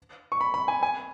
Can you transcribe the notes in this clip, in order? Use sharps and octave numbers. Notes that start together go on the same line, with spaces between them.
C#6
B5
B5
G#5
G#5